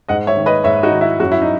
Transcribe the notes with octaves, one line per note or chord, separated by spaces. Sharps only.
G#2 D#5 F#5
C#5 E5
D#3
B4 D#5
G#2 C#5 E5
D#4 F#4
D#3
E4
F#2 F#4
E4
D#4